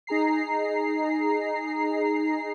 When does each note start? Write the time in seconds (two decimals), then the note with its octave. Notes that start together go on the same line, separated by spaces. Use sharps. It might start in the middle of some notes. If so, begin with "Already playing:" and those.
0.07 D#4 G#4 A#5 C7